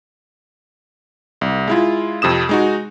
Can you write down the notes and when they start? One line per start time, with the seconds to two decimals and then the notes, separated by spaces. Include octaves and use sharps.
1.41 C2
1.67 G#3 E4 F4
2.22 F2 C3 D#6 E7
2.49 G#3 D#4 F#4